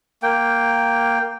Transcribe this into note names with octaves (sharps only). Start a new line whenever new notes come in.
A#3 G5